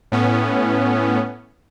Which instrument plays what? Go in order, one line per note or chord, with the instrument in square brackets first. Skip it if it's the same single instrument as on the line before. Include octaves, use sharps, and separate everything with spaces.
[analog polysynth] A2 B3 C#4